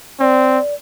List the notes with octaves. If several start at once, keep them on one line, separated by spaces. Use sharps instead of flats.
C4 D5